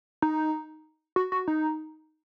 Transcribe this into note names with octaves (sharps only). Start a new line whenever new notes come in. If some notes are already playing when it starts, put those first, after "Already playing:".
D#4
F#4
F#4
D#4